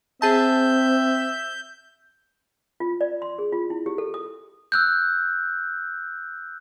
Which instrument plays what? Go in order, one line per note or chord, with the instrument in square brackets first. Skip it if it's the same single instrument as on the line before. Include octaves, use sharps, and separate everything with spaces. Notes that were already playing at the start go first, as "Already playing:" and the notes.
[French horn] C4 [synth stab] G#4 A5 [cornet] E5 [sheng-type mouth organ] G6
[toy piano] F4
D5
C6
G#4
F4
E4
G4
A4
D#6
[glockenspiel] E6 F#6 G6